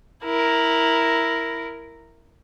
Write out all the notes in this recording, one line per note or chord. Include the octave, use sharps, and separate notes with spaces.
E4 A#4